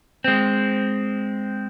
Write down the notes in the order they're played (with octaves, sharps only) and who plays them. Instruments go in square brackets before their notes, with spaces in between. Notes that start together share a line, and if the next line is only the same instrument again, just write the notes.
[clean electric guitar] G#3 C4